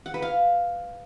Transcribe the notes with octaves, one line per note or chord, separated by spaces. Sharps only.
F#5
B4
F5